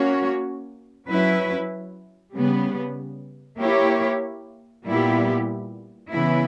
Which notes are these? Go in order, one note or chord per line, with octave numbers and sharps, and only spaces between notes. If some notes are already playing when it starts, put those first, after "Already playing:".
Already playing: A#3 C#4 F#4 C#5
F#3 C#4 E4 B4
C#3 G3 B3
A#3 E4 G4 C#5
A#2 G3 B3 E4 G4
C#3 E3 B3 E4